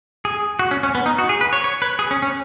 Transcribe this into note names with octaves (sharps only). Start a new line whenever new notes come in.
G#4
F#4
C#4
C#4
B3
D#4
F#4
G#4
B4
C#5
C#5
B4
G#4
C#4
C#4